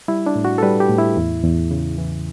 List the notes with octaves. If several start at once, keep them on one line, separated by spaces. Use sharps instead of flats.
G3 E4
D4
A2
F#4
A4
G3 B4
G4
A2
E4
E2
E2
C#3
E3